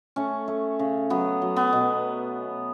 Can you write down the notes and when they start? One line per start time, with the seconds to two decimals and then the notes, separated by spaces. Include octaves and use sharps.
0.16 A3 C#4
0.48 A3
0.79 C#3
1.10 F#3 B3
1.42 F#3
1.56 B3
1.73 B2